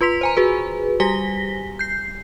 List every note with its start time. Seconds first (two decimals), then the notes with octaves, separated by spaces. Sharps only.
0.01 F4 B4 C6 B6 F7
0.21 C5 G#5 A#5
0.37 F#4 G#4 B4
1.00 G3 G4 G#5 A#6 B6 G7
1.79 G6 C7